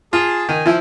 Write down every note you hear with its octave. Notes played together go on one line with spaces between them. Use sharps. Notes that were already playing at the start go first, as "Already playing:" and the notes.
F4 G#4 A5
D#3 G#5
F3 E4